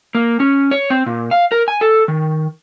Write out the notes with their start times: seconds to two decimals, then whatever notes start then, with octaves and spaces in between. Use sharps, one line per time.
0.15 A#3
0.40 C#4
0.71 C#5
0.90 C4
1.06 A#2
1.31 F5
1.52 A#4
1.68 G#5
1.81 A4
2.08 D#3